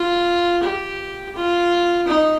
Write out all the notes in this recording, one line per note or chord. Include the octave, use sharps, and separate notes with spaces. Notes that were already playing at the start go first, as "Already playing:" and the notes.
Already playing: F4
G4
F4
D#4